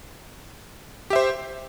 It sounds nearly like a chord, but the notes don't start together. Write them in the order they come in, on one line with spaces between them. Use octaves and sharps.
G4 E5 C5